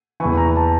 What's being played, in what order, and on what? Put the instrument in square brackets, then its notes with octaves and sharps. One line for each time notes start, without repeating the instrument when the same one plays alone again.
[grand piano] E3 C#6
E2
A#5
A5